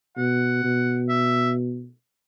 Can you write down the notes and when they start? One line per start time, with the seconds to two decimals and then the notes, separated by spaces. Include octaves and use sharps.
0.17 B2 F#5
0.64 B2
1.09 E5